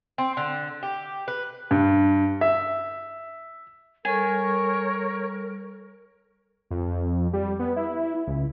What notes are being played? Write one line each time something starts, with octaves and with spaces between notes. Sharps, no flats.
C4
D3
G4
B4
G2
E5
G3 A4 A#4 C#5 G#5
F2
G3
B3
E4
C#2